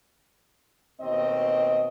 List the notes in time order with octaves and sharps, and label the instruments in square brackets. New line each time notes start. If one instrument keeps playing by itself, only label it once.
[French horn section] D#2 B2 C4 D#5